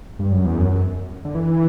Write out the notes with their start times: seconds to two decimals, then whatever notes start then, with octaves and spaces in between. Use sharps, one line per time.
0.19 G2
0.32 F#2
0.45 E2
0.58 F#2
1.25 D3
1.35 E3